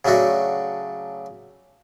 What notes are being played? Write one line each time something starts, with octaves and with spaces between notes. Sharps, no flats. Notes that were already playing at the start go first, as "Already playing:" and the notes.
C#3 F#3 A3 D4 F#4